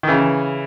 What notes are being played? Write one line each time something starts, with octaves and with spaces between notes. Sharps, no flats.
D#3
C#3 E3